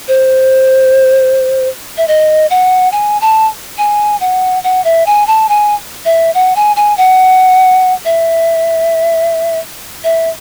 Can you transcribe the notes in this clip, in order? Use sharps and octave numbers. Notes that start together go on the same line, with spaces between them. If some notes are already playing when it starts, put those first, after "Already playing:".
C5
E5
D#5
F#5
G#5
A5
G#5
F#5
F#5
E5
G#5
A5
G#5
E5
F#5
G#5
G#5
F#5
E5
E5